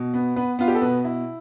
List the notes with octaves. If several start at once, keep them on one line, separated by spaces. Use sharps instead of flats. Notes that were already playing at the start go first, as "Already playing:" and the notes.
Already playing: B2
B3
B3 B4
B3 F4
G4
A4
B2 B4
E4